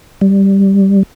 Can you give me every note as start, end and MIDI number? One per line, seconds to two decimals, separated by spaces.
0.21 1.03 55